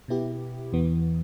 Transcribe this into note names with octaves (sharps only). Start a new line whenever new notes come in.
B2 B3 E4 G4
E2 E3 B3